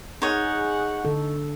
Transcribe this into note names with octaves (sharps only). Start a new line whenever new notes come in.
D#4 G#4 C#5 F#5
D3 A4